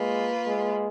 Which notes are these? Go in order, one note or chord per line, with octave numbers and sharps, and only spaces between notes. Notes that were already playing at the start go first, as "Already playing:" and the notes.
Already playing: G#3 A#3 F4 B4
G#3